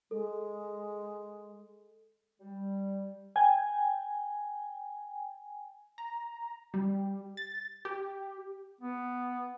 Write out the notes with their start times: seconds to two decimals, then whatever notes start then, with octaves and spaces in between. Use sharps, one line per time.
0.11 G#3 A4
2.39 G3
3.36 G5 G#5
5.98 A#5
6.74 G3
7.37 A6
7.85 G4
8.81 B3